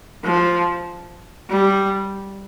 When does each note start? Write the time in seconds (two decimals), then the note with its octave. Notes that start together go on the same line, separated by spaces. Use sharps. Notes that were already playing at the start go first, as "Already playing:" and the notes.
0.24 F3
1.50 G3